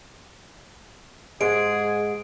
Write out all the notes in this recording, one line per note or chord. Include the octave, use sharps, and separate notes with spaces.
G#2 G#3 G#4 D7